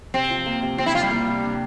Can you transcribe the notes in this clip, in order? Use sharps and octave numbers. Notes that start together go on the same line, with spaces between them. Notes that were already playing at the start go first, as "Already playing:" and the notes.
C3 C4
F3
A#3
C3
F3 C4
E4
F3 F4
G3
A#3
C3
D4